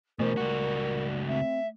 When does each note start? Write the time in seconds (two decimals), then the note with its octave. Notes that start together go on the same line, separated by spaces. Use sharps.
0.19 B2 E3 A3 A#4 C5
0.37 C#2 G3 F#4
1.27 C4 E5